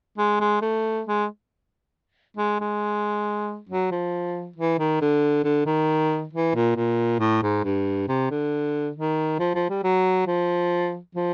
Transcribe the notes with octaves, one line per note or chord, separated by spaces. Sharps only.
G#3
G#3
A3
G#3
G#3
G#3
F#3
F3
E3
D#3
D3
D3
D#3
E3
A#2
A#2
A2
G#2
G2
C3
D3
D#3
F3
F3
G3
F#3
F3
F3